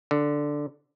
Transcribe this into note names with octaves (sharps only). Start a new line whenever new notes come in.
D3